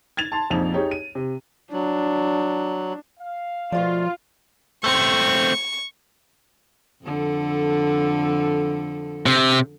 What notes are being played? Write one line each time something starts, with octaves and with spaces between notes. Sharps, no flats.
G#6 A6 F7
A5 C6
A#1 F2 D#4 F7
D#4 G4 G#4 C#5
D#7
C3
F#3 D4
F5
B2 F3 A3 F4 D5
A3 C4 C#6
F2 D3 A4
C3